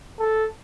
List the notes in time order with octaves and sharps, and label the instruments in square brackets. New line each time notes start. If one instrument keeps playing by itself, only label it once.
[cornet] A4